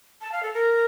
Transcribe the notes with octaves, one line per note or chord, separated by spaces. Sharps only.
A5
F5
A4
A#4